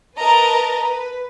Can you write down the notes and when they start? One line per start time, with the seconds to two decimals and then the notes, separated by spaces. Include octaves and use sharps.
0.16 A#4 B4 D#5 A5 A#5
0.77 B4